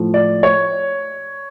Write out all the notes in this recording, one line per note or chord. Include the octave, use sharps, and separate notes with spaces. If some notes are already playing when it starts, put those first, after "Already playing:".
Already playing: A2 F3
D5
C#5